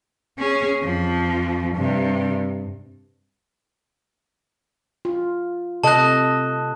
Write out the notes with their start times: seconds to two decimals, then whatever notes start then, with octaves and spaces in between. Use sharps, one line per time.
0.38 C#4 G#4
0.83 F2 F3
1.75 G2 C3
5.05 F4
5.84 C3 A4 D#5 A5 F#6